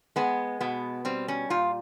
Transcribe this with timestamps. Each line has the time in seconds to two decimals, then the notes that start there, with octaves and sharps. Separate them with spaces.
0.16 G#3 B3
0.61 B2 B3
1.05 G3 C4
1.28 C#4
1.50 A#2 F4